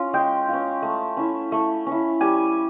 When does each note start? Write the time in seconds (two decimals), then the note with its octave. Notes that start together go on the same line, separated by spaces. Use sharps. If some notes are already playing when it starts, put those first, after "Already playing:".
Already playing: C#4 F4
0.13 G#3 G5
0.49 C#4 F4
0.82 A3
1.17 C#4 E4
1.52 A3
1.87 C#4
1.92 E4
2.21 G3 G#5